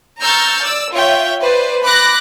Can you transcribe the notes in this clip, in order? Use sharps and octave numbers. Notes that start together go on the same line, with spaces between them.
A#5 C#6 E6 F6 G6 A6
D5 E6
F4 C#5 E5 G5
B4 C5 D5
B5 D6 F#6 A#6